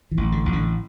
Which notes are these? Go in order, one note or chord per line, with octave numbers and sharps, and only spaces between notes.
E3
A1
D3
A1
D3